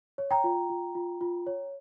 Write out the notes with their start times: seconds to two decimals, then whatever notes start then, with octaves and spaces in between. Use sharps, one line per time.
0.18 C#5
0.31 G5 A#5
0.44 F4
0.70 F4
0.95 F4
1.21 F4
1.47 C#5